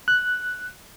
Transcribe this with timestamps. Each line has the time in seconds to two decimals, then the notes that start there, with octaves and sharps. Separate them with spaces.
0.08 F#6